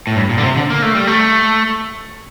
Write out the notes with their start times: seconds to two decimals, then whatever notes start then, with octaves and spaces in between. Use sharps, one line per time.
0.07 A2
0.16 G2
0.30 A#2
0.38 D3
0.43 C3
0.57 D3
0.70 A#3
0.82 A3
0.95 G3
1.07 A3